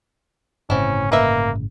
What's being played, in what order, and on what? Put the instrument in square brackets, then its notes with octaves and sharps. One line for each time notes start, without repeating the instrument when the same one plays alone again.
[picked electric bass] G1 A2 C#3 [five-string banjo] C4 E4 [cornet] C#4
[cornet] A#3 [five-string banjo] B4 D#5 E5